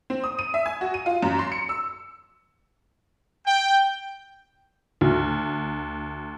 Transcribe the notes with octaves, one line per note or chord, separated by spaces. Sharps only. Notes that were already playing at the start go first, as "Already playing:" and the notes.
C4
D#6
D#7
E5
G#5
F#4
D#7
F4
F#2
C6
C#7
E6
G5
D2